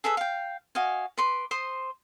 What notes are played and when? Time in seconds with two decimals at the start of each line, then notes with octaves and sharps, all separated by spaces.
0.04 G#4 A4 B4 E5
0.17 F5 G5
0.75 F#4 D#5 F5 G#5
1.17 B4 C6 D6
1.51 C5 C6 D#6